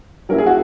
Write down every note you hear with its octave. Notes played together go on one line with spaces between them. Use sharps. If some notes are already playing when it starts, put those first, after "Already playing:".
F#3 A#3 C#4 E4 A#4
G#4
F#4